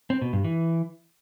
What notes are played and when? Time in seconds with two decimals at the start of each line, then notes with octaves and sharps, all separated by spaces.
0.10 C4
0.22 B2
0.33 G2
0.44 E3